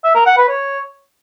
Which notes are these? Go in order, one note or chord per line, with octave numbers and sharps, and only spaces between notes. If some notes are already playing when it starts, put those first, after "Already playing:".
E5
A#4
F#5
B4
C#5